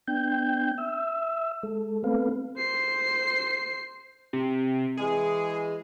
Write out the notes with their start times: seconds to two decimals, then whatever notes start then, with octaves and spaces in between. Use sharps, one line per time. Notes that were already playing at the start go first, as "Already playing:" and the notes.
0.08 B3 D4 G5 G6
0.78 E5 E6
1.63 G#3 A4
2.04 A3 B3 C4 A4 B4 F5
2.57 C5 C7
4.33 C3
4.97 E3 G#3 G#4